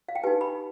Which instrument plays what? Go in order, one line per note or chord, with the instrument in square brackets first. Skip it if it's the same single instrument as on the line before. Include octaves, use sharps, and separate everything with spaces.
[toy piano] F5
G5
D#4 G4 B4 G#5
B5